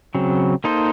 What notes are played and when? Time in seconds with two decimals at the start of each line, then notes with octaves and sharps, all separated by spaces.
0.15 C#3 F#3 C4
0.64 A#3 D#4 A4 C5 D#5